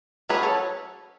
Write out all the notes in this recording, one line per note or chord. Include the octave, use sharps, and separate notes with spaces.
F#3 C#4 G#4 B4
A4 C#5